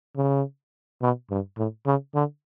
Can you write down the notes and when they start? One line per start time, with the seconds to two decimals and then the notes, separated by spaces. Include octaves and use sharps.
0.16 C#3
1.02 B2
1.30 G2
1.58 A2
1.86 C#3
2.15 D3